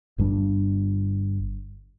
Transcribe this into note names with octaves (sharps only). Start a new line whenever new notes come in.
G1 G2 G3 D4